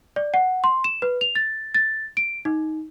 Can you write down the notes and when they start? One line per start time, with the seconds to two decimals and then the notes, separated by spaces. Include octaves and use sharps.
0.16 D5
0.34 F#5
0.64 C6
0.84 E7
1.02 B4
1.21 F7
1.35 A6
1.75 A6
2.17 D7
2.45 D#4